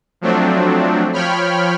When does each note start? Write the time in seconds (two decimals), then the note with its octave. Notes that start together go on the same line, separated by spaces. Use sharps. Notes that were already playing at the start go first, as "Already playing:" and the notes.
0.21 F3 F#3 A3 C4 D4
1.13 F3 C#5 G5 B5 F6